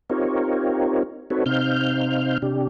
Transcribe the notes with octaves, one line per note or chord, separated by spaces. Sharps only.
C4 D#4 F4 G4 A#4 C#5
C4 D#4 F#4 A4 B4 C#5
C3 C4 D#4 F5 F6 G6
C3 D4 G4